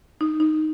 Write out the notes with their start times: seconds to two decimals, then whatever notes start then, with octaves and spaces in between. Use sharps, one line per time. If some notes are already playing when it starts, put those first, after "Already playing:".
0.21 D#4
0.40 D#4